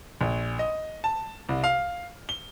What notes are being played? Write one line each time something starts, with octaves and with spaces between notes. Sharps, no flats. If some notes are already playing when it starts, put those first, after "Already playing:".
A#1
D#5
A5
C2
F5
G7